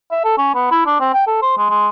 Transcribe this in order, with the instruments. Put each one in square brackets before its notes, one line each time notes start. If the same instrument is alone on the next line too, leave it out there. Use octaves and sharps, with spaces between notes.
[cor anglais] E5
A4
C#4
B3
E4
D4
C4
G5
A4
C5
G#3
G#3